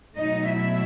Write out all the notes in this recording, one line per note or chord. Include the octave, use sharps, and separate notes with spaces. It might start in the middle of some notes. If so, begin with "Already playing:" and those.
B2 F#3 A3 D#4 D#5
E4 E5